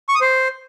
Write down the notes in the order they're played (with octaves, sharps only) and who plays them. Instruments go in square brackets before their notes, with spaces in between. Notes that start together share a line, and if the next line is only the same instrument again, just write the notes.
[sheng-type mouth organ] C#6
D#6
C5